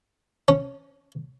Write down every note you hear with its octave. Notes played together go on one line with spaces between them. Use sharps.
C#4